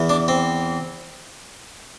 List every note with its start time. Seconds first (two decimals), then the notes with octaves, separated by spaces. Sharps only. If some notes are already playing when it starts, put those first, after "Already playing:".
Already playing: E2 E3
0.09 D4
0.28 C4